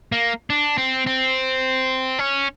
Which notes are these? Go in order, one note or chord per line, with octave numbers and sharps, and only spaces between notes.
A#3
D4
C4
C4
C#4